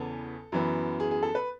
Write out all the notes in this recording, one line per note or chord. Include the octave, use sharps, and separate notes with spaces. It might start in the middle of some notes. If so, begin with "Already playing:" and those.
Already playing: E2 C#3 E3 B3 A4
F#2 E3 B3
G#4
G#4
A4
B4